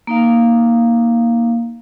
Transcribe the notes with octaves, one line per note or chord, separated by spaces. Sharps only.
A#3 D#4 F5